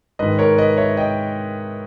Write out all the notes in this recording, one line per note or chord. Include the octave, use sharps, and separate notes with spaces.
G#2 D#3 B4 D#5
A#4 C#5
B4 D#5
C#5 E5
D#5 G5